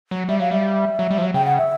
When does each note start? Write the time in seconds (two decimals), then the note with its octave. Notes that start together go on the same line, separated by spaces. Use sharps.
0.11 F#3
0.29 G3 E5
0.40 F#3 F5
0.51 G3 E5
0.99 F#3
1.10 G3
1.18 F3
1.22 F#3
1.34 C#3 G5
1.46 F#5
1.58 E5